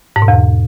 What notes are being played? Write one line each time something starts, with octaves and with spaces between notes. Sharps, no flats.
G#2
B2
E2